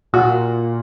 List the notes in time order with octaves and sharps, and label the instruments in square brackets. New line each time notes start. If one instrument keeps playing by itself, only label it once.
[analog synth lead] A#2 [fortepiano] F#4